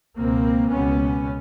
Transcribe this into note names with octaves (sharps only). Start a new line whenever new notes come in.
C#2 B2 A#3 C4
C#2 B2 B3 C#4